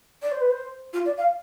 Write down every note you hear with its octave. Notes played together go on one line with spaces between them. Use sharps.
D5
C5
B4
C5
F4
D5
F5